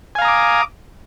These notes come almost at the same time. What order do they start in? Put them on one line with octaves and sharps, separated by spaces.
G#5 F5 A#5 D#6 D6